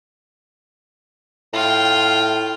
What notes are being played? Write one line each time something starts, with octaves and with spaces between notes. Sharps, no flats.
A2 F4 G5